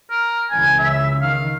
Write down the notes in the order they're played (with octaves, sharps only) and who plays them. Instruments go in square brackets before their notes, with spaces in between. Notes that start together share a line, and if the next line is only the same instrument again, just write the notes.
[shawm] A#4
[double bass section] C#2 C#3 E3 [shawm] G#5
[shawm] E5
[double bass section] D#3 [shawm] F5